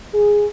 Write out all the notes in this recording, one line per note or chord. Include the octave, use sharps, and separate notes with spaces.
G#4